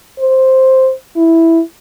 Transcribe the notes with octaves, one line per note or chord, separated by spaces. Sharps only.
C5
E4